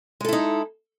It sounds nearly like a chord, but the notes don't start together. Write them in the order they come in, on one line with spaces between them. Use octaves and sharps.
G#3 A4 E4 D#4